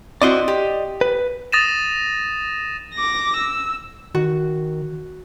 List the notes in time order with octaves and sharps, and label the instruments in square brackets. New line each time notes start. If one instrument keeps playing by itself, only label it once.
[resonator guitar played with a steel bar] C4 E4 F#4 [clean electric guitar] D5 D#5 C6
[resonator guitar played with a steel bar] G4
[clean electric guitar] B4
[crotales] D#6 A6 A#6 D#7 E7
[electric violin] D6 A#6
E6
[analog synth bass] D#3 [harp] F#4